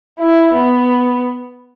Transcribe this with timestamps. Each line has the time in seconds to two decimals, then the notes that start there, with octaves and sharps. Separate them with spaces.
0.19 E4
0.54 B3